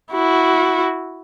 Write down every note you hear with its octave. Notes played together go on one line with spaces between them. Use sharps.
E4 F#4